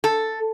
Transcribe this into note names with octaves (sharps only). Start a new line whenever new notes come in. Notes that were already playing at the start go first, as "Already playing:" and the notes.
A4